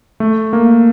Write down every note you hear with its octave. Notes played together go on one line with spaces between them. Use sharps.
A3
A#3